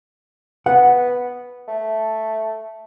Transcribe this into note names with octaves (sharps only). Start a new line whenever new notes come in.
B3 F#5
A3